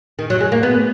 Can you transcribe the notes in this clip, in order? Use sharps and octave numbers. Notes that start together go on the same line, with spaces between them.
D#3
F#3
G#3
A#3
B3